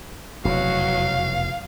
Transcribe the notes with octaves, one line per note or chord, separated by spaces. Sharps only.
F1 E2 B2 F#3 F5